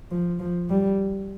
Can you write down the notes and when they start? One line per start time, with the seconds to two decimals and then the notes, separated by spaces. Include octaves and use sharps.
0.11 F3
0.39 F3
0.70 G3